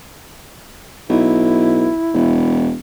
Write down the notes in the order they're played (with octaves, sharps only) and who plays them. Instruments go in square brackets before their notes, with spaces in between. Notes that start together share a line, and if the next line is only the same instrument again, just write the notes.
[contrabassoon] B1 [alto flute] E4
[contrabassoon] E1